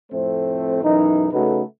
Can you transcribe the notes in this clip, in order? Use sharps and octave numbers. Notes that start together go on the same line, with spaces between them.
F2 A2 A3 C4 C5
B1 F#2 E3 D#4
C#3 A3 D#4 F#4 A4 B4